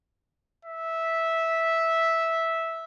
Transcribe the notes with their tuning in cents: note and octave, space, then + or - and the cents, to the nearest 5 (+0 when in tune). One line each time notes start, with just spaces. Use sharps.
E5 -10